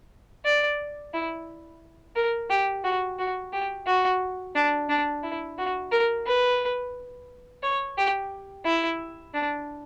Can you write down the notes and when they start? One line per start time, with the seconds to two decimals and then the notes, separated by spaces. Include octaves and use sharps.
0.45 D5
1.14 E4
2.16 A#4
2.50 G4
2.84 F#4
3.19 F#4
3.53 G4
3.86 F#4
4.55 D4
4.89 D4
5.23 E4
5.58 F#4
5.92 A#4
6.26 B4
7.63 C#5
7.97 G4
8.65 E4
9.34 D4